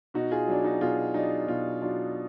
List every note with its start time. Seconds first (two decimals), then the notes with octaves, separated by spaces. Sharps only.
0.14 B2 D#4 F#4
0.31 F4 G#4
0.47 F#3 D4
0.64 D#4 F#4
0.81 B2 F4 G#4
1.14 F#3 D4 D#4
1.48 B2 F4
1.81 F#3 D4 F4